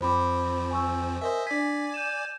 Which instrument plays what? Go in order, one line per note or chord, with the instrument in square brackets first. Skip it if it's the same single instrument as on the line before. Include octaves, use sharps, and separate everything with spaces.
[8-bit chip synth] F2 F3 C4 [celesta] C5 B5 D6
[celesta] G#5 C#6 E6
[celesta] A#4 G#5 [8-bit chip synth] C5 D#5 E5
[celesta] D4 B6 [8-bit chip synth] D5 G#5
[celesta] G6 D#7 E7